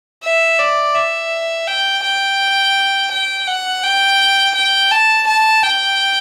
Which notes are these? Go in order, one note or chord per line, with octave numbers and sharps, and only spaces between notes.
E5
D5
E5
G5
G5
G5
F#5
G5
G5
A5
A5
G5